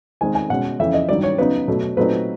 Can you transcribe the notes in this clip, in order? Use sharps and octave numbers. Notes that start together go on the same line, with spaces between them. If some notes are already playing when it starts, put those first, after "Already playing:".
D#3 G#3 C4 G#5
G#5
B2 G#3 C#4 F#5
F2 C#3 E3 E5
D#5
G2 D#3 F#3 D5
C#5
C#3 F#3 B3 D#4 B4
B2 F#3 A3
A#2 F#3 A3 C4 D#4 B4